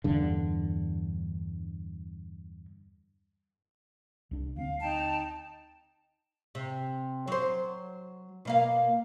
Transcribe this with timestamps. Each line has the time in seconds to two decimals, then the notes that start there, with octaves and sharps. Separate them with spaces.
0.04 E2 G2 D3
4.31 C2 D4
4.56 D2 G3 C4 F5
4.81 D#4 G5 A5
6.55 C3
7.28 F#3 C5
8.45 B2 A#3 F5